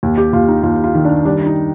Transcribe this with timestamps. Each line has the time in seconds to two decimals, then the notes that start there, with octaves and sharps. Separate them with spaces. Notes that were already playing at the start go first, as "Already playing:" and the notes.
0.03 D#2
0.18 G4
0.33 D#2 F4
0.48 D#4
0.63 D#2 F4
0.84 F4
0.95 D#3
1.05 D4
1.25 G3 D4
1.46 D#4